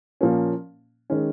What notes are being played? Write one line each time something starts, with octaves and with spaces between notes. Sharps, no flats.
A#2 F3 A#3 C#4
D#3 G#3 C#4